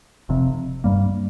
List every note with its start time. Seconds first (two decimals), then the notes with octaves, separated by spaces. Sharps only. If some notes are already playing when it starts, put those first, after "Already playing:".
0.29 F1 F2 C3
0.84 G2 G3 A#3